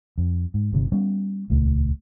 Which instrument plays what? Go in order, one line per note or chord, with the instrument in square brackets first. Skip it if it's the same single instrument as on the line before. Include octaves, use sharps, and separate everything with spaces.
[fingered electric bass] F2
G#2
G1 C3 D#3
G3 B3 C#4
D#1 C#2 A3